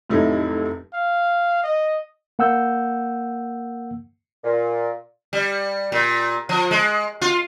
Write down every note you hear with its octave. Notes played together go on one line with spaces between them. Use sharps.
F1 A2 C3 F#3 D#4 E4
F5
D#5
A#3 F#5 E6 G6
A#2
G3
A#2
F3
G#3
F4